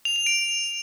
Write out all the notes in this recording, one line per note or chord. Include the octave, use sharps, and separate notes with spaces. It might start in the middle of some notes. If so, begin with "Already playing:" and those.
F7
F7
D7